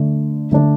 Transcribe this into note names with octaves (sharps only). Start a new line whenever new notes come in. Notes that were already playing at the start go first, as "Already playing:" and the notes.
Already playing: D3 A3 D4
D3 A3 D4